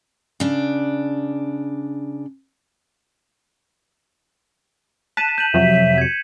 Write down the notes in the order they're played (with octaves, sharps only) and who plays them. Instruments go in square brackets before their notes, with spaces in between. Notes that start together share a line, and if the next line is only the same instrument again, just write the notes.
[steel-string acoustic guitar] C#3 D4
[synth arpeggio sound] A5 F#6 [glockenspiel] B6 D#7 E7
[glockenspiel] G6 D#7 F#7
[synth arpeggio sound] F2 C3 F#3 [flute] E5
[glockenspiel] G#6 C#7